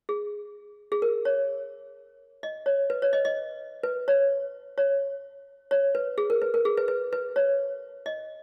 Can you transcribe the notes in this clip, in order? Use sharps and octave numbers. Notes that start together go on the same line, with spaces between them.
G#4
G#4
A#4
C#5
D#5
C#5
B4
C#5
D#5
D#5
B4
C#5
C#5
C#5
B4
G#4
A#4
B4
A#4
G#4
B4
B4
B4
C#5
D#5